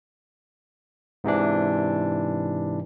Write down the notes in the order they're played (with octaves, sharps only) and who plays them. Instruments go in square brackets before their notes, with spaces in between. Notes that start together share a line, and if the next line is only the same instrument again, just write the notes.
[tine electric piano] G#2 C3 E3 D4